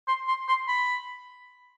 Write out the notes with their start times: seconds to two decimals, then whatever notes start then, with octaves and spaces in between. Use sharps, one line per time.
0.08 C6
0.28 C6
0.48 C6
0.68 B5